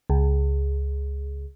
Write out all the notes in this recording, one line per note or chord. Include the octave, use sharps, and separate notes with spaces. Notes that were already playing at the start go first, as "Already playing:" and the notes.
C#2